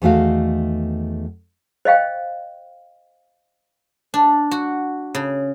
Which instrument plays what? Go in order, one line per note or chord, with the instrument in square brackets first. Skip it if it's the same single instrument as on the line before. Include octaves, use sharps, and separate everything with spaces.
[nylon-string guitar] E2 D#3 A3 F#4 F5
[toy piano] C5 D#5 F5 G5
[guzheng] D4
F#4
C#3